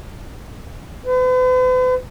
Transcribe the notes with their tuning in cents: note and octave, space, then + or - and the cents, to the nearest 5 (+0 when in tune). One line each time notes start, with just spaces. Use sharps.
B4 +45